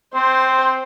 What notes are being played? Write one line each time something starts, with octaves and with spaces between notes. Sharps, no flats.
C4 C5